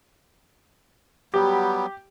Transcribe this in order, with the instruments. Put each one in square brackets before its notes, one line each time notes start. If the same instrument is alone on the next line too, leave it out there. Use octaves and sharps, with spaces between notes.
[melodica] F#3 G3 B3 [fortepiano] G4